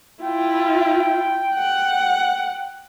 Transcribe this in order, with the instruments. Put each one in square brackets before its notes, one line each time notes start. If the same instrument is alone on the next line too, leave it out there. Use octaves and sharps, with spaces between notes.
[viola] E4 F4 [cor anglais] G5
[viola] F#5